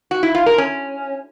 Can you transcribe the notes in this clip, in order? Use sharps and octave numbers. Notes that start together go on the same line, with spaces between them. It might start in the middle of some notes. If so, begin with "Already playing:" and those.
F#4
E4
F4
A#4
C#4